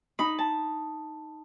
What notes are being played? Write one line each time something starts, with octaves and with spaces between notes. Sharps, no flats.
D#4 B5
A5